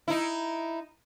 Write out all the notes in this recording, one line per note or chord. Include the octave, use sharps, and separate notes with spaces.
D#4 E4